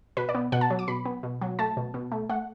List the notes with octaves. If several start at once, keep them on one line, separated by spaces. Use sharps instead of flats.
B2 B4
D5
B3
B2 F#5
A5
F#3
D6
B2 B5
B3
B2
F#3
A3 A5
B2
B2
A3
A3 F#5